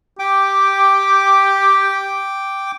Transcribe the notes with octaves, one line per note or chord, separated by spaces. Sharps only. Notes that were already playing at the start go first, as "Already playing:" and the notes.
G4 G5 D6